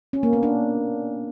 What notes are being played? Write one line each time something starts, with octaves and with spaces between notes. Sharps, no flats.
C#4
A#3
B3
D4